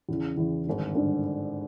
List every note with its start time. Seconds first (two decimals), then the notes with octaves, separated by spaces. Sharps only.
0.09 E2 C#3 E3
0.37 E2 C#3 E3
0.67 G#1 G2 D3
0.96 G#1 G2 D3